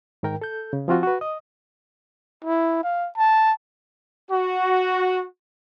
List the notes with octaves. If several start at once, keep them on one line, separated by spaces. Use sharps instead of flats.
G#2 D#3 A#4 G5
A4 G6
C#3
F3 C4 F4 F#4
F#4 B4
D#5 D#6
E4
F5
A5
F#4